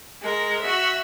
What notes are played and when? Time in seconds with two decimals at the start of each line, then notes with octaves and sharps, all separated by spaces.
0.21 G#3 A#4
0.61 F#4 E5